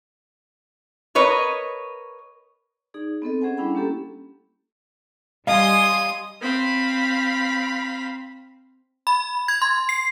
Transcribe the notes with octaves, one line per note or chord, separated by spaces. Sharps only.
A#4 B4 C#5 D#5
D#4 G#4 D5
B3 C4 A4 D#5
C#4 G#4 C5 F#5 G#5
G3 C#4 D4 E4 G5 B5
A#3 C#4 G4 A4
G3 D#5 F5 G#5 C6 D#6
C4 F5 B5
B5
G#6
C6
C7